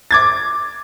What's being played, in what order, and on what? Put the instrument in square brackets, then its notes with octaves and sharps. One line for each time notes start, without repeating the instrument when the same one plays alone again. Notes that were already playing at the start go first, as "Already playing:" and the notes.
[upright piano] D6 G#6 A6